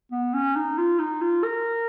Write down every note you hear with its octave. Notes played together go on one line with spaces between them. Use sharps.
B3
C#4
D#4
F4
D#4
F4
A#4